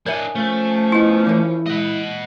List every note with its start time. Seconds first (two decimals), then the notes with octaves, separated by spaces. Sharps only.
0.06 D4 A#4 C#5 D#5 E5 G#5
0.35 F3 A3 C#4
0.92 B3 E4 D#5
1.27 E3 E4 A#4
1.66 G#3 D#5 F#5